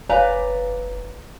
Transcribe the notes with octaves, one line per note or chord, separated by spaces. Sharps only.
F#1 B4 C#5 D5 F5 G#5 A#5